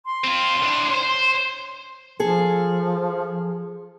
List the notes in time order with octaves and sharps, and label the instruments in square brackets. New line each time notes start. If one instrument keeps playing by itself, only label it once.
[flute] C6
[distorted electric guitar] C4 F4
A2 D4
C5
[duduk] F3 [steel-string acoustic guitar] G#4 A4